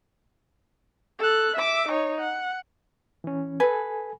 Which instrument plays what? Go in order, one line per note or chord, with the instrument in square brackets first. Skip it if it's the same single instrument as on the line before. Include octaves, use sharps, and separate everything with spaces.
[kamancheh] A4 F#6
E5 D6
D#4 C#5
F#5
[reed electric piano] E3 C#4
[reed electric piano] A4 G#5 [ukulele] B4